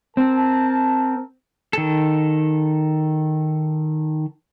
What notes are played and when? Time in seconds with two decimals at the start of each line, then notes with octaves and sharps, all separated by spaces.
0.17 C4 A#4 A5
1.73 D#3 A4